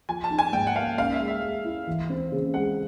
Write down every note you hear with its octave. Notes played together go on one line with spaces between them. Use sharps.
F3 G#5
A5
D#4
G#5
G#2 G5
F#5
A#3 F5
C#4 F5
E5
G#3
E5
G#3
E4
E3
C4
C#3
G#3 F#5